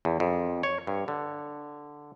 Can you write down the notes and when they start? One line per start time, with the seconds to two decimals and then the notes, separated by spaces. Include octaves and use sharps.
0.05 E2
0.20 F2
0.63 C#5
0.87 G2
1.08 D3